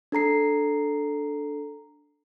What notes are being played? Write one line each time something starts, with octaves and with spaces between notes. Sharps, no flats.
D4 A4 A#5 C7